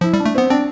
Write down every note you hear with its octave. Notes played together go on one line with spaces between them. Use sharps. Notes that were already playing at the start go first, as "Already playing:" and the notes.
F3 E4
G3
D4
A3
B3 C4
C4 D4